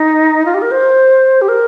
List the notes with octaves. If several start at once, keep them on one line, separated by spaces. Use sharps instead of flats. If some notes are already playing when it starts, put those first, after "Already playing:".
Already playing: D#4
F4
G4
A#4
C5
G4
A#4